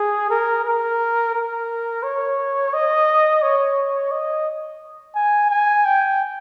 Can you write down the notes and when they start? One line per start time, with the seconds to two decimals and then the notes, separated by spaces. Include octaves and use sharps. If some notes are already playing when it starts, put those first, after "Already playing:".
Already playing: G#4
0.31 A#4
0.65 A#4
1.35 A#4
2.03 C#5
2.74 D#5
3.43 C#5
4.12 D#5
5.16 G#5
5.51 G#5
5.85 G5